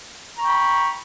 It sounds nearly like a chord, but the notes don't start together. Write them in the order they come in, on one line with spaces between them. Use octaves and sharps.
A#5 C#6 G5 B5